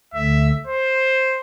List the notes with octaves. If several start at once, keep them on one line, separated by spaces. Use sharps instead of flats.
D2 D3 A3 E5
C5